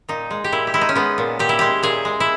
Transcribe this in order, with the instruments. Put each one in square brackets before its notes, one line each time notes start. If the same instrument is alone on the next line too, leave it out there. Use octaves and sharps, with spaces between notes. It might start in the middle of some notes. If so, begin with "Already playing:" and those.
[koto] A#2 D#4
G#3
G4
A#2 E4
G4
G#3 E4
D#4
C#4
G#3 B3
A#2
A#2 G4
E4
G#3 G4
A#2 G#4
G#3
E4